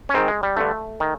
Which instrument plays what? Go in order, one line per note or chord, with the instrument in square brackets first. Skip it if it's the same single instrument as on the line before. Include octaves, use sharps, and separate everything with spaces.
[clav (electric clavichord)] C#4
G#2 D#3 C4
G#3
G3
G2 D3 A3
D#3